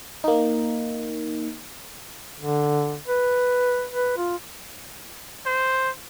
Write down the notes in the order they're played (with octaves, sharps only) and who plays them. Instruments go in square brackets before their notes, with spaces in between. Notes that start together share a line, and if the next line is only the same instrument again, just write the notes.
[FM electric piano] A#3 D#4
[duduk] D3
B4
B4
F4
[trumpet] C5